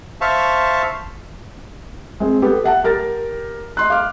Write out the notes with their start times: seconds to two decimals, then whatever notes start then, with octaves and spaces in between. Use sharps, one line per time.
0.21 C5 E5 F5 A5 C#6
2.20 G#3 C4
2.42 B3 G4 A4
2.64 E5 F#5 A5
2.84 G4 A#4 F6 A6
3.77 D#5 C6 F#6
3.90 F5 D6 F6